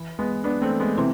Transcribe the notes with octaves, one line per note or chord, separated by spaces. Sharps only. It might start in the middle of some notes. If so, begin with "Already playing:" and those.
Already playing: E3
G#3 B3
B3 D4
A3 C4
G#3 B3
C3 E3 C4